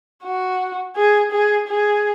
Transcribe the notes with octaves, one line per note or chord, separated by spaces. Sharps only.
F#4
G#4
G#4
G#4